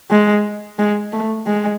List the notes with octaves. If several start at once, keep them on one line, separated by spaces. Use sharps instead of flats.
G#3
G#3
A3
G#3